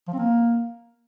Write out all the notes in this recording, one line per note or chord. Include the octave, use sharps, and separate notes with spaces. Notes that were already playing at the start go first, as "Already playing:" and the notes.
F3
C4
A#3